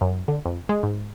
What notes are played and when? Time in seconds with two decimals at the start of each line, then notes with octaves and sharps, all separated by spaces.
0.01 F#2
0.28 D3
0.45 F2
0.69 G#3
0.83 G#2